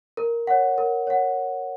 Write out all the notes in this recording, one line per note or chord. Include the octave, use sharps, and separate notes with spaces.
A#4
C#5 F#5
A#4
C#5 F#5